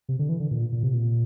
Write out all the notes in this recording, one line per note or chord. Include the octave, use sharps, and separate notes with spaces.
C3
D3
E3
D3
A#2
A#2
C3
A#2